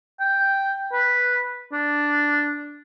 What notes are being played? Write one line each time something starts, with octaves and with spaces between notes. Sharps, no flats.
G5
B4
D4